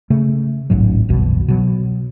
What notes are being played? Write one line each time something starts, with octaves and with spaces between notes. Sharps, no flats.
C#3 A3
D1 A1 G#2 F#3
F#1 C2 B2 E3
B2 F#3